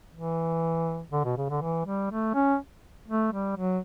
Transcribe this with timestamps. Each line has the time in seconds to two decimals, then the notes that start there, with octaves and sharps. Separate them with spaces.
0.14 E3
1.12 D3
1.24 B2
1.37 C#3
1.50 D3
1.62 E3
1.86 G3
2.10 A3
2.34 C#4
3.08 A3
3.32 G3
3.56 F#3